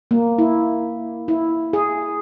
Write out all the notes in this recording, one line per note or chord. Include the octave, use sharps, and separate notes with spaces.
A#3
E4
E4
G#4